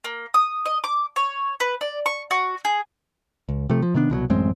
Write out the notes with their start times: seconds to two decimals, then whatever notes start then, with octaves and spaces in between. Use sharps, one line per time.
0.04 A#3
0.34 D#6
0.66 D#5
0.84 D6
1.16 C#5
1.60 B4
1.81 D5
2.06 C#6
2.31 F#4
2.65 G#4
3.49 C#2
3.70 C3 F3 A3
3.82 F3
3.94 C3 D#3 B3 D4
4.10 C2 B2 F3 F#3
4.30 A1 F#2 G#3 C4